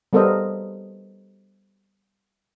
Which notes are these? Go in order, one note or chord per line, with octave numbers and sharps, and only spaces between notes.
G3 B3 A4 A#4 C5 D#5